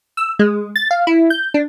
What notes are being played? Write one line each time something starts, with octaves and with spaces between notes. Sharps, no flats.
E6
G#3
A6
F5
E4
G6
D4